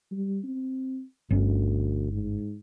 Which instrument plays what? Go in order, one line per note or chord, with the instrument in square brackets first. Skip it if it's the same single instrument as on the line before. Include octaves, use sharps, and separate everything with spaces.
[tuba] G3
C4
[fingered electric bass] G1 C#4 [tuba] D2
[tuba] G#2